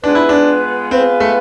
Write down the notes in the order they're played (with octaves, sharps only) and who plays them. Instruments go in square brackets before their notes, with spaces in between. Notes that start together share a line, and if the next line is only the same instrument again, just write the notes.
[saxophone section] G#3 B3 F4 B4 [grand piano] D4
[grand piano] E4
D4
[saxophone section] G#3 B3 F4 B4 [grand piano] C4
[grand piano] A3